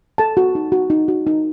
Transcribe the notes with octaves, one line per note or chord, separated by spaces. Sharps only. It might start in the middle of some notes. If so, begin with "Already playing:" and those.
A4 A5
F#4
D#4
F#4
D#4
F#4
D#4